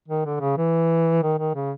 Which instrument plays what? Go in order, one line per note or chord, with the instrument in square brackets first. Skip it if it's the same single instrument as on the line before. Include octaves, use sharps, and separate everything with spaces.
[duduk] D#3
D3
C#3
E3
D#3
D#3
C#3